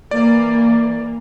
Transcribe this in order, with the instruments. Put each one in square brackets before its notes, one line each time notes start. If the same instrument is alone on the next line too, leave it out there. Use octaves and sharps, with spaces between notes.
[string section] E3 A#3 [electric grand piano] D5